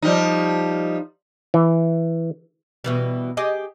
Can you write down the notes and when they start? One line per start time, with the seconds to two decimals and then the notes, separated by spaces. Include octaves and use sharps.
0.02 F3 G3 D#4
1.54 E3
2.84 B2 E3 G3
3.37 G4 G#4 D#5